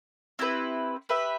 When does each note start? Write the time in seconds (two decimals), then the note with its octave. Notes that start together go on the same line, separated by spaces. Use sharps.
0.39 C4 E4 G4 B4
1.09 G4 B4 E5